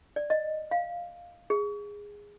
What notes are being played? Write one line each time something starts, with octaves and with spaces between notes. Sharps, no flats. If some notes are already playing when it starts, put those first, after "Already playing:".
D5
D#5
F5
G#4